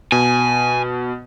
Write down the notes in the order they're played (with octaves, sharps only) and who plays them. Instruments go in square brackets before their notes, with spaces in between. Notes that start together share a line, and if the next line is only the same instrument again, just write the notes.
[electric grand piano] B2 [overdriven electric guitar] G#5